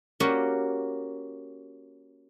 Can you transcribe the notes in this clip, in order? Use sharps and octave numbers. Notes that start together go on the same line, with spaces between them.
A#3 C#4 F#4 G4